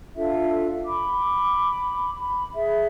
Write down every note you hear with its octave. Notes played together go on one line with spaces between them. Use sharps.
D4 F4 A4 E5
B5 D6
B5
G#4 E5